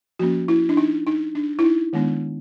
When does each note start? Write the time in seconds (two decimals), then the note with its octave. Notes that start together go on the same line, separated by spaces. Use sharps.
0.19 F3 A#3 C#4 F#4
0.48 E4
0.69 D4
0.77 D#4
1.07 D#4
1.35 D4
1.59 E4
1.64 D#4
1.93 D#3 G#3 B3 D4